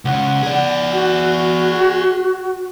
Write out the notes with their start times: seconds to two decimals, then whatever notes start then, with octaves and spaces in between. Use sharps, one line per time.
0.05 C#2 C#3 F#5
0.43 G#4 D5
0.92 F#4